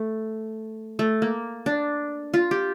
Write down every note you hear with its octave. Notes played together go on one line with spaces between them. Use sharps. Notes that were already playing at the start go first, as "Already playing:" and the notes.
Already playing: A3
A3
A#3
D4
F4
G4